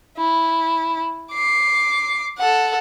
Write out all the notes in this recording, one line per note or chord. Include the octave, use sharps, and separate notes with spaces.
E4
D6 C7
A4 F#5